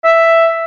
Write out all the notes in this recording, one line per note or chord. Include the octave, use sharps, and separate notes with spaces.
E5